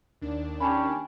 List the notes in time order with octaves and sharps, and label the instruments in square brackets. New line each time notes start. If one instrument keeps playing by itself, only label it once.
[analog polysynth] D#2 D4
[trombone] C#4 [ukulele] G4 A5 B5